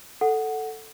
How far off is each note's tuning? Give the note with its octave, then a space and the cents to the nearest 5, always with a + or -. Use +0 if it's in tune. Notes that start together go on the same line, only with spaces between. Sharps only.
A4 +0 F#5 +0